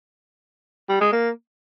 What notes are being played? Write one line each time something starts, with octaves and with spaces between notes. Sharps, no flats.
G3
G#3
A#3